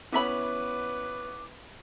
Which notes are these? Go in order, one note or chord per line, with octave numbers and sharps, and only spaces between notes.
B3 C#4 E4 B4 E5 B5 D6